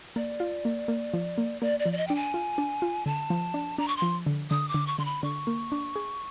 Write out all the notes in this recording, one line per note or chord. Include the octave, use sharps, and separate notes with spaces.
A#3 D5
F4
A#3
A#3
F3
A#3
A#3 D5
D5
F3
D5
D#5
D4 G5
G#5
F4
D4
F4
D3 A5
F3
D4
D4 A#5
C#6
C6
F3
D3
D3 D#6
D6
D3
C#6
D3 C6
B5
D3 C#6
A#3
D4
G#4